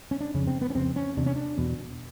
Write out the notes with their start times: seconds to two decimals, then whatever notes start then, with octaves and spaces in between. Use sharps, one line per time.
0.11 C#4
0.21 D4
0.34 F2 C#3 C#4
0.47 C4
0.61 B3
0.70 C#4
0.75 F2 C#3 C4
0.96 C#4
1.17 E2 C3 D4
1.26 C#4
1.36 D4
1.58 E2 B2